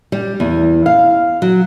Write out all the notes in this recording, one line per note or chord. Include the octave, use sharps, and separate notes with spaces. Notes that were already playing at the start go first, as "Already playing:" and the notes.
G3
E2
F5
F#3